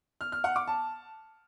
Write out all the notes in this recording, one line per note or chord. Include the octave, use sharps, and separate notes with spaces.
F6
F6
F#5
D6
A5